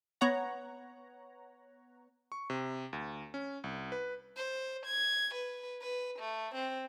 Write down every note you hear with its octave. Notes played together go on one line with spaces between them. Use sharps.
B3 C#5 F#5 A#5
C#6
C3
D2
C#4
C2
B4
C5
G#6
B4
B4
A3
C4